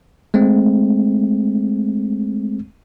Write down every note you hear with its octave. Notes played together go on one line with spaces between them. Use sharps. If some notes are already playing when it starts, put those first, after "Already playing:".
G#3 A3 C4